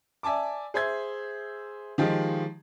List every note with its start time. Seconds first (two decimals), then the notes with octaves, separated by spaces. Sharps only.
0.23 D5 E5 G#5 A5 D6
0.74 G#4 C5 E5 G#6
1.98 D#3 F3 G#3 G4